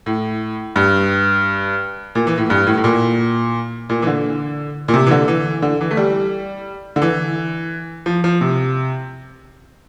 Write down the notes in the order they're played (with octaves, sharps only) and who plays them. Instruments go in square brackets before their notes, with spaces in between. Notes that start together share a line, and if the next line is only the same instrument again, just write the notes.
[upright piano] A2
G2
A#2
E3
A2
G2
A2
A2
A#2
A#2
E3
D3
A#2
C3
E3
D3
E3
D3
E3
A3
G3
D3
E3
F3
F3
C3